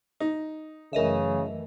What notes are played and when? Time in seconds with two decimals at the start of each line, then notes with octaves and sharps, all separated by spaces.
0.20 D#4
0.93 F#2 C#3 E3 A3 A#4 D#5 E5